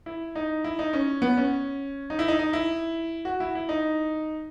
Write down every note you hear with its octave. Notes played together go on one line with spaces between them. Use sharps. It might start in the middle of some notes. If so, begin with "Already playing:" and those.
E4
D#4
E4
D#4
C#4
B3
C#4
D#4
E4
D#4
D#4
E4
F#4
E4
E4
D#4